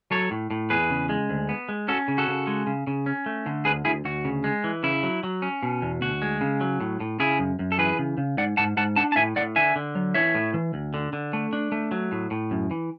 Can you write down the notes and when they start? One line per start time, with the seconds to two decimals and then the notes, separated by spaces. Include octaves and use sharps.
0.11 F#3 A4 C#5
0.31 A2
0.51 A2
0.70 E2 G#4 B4
0.90 C#3
1.09 G#3
1.29 D2
1.49 B3
1.69 G#3
1.88 C#4 F#4 A4
2.08 C#3
2.18 F#4 A4
2.28 C#3
2.47 G#3
2.67 C#3
2.87 C#3
3.06 C#4
3.26 A3
3.46 D3
3.65 D2 G#4 B4
3.85 D2 E4 G#4
4.05 D2 F#4
4.25 C#3
4.44 G#3
4.64 E3
4.83 C#3 E4
5.03 F#3
5.23 F#3
5.42 C#4
5.63 B2
5.82 E2
6.02 D2 F#4
6.22 G#3
6.41 C#3
6.61 F#3
6.81 A2
7.00 A2
7.20 C#3 E4 G#4
7.39 F#2
7.59 F#2
7.72 A4
7.78 E3 G#4 B4
7.99 C#3
8.18 C#3
8.37 G#2 D5 F#5
8.57 G#2 F#5 A5
8.77 G#2 F#5 A5
8.96 D4 F#5 A5
9.12 A5
9.16 A2 E5 G#5
9.36 A2 D5 F#5
9.56 D3 E5 G#5
9.76 D3
9.95 F#3
10.14 E3 C#5 E5
10.34 A2
10.54 E3
10.74 D2
10.94 D3
11.13 D3
11.33 A3
11.53 D4
11.72 A3
11.91 F#3
12.12 A2
12.31 A2
12.51 F#2
12.71 E3